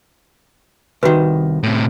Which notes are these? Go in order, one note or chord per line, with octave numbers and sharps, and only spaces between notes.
C2 D#3 F#4 B4
A2 C3